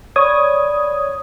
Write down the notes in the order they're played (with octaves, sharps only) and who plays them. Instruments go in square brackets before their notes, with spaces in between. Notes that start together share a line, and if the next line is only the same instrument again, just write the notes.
[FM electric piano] C#5 D#6 G#6 [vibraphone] D5 B5